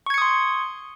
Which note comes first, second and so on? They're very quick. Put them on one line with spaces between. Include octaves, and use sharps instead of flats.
C#6 G#6 C#7 D#6 C6